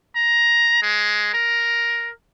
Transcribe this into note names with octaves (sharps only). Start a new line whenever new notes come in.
A#5
G#3
A#4